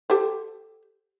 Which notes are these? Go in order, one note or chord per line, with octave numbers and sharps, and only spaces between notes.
G4 A4 C5